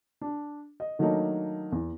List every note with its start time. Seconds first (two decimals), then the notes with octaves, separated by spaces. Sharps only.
0.21 D4
0.80 D#5
0.99 D#3 F#3 A3 A#3 D4 D#4
1.72 E2